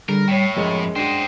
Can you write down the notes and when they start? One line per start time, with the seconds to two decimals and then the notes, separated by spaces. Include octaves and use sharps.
0.09 D3 G3 G#4 A#4
0.28 A2 C#5 G5
0.56 F#2 F3 G#3 C#4 C#7
0.96 D4 F#4 C5 D#5 G5